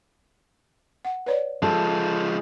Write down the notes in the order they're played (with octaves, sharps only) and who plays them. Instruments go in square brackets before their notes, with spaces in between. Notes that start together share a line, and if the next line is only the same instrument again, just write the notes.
[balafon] F#5
B4 C#5 D5
[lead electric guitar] F3 G#3 [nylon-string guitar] A4